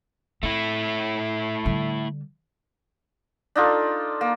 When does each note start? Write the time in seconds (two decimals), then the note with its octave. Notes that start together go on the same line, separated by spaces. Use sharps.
0.43 A3 C4 E4
1.66 D3 G3
3.55 D4 D#4 F4 A4
4.21 A#3